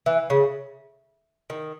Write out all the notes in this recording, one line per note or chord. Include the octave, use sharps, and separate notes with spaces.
E3
C#3
D#3